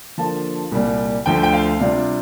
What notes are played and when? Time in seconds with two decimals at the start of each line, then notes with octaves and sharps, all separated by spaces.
0.18 D3 F3 A#3 F4 A5
0.72 C2 A#2 G3
1.26 D2 D3 F3 A3 G5
1.43 G5
1.53 F5
1.80 C3 G3 D4 F4